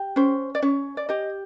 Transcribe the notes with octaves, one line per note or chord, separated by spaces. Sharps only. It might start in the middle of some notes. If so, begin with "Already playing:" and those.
Already playing: G4
C#4 C5
D5
C#4 C#5
D5
G4 D#5